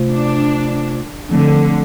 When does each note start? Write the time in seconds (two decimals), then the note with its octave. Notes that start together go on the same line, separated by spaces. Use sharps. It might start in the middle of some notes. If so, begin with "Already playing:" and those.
Already playing: C3 A3 F4 C5
0.10 D4
1.31 D3 F3 A3 C4